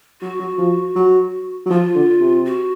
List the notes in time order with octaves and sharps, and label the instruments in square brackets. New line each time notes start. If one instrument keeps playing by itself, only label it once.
[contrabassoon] F#3 [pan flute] F#4
[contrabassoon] F#3
F3
F#3
F#3
[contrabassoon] F3 [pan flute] F4
[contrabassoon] D3
C3
[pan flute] F#4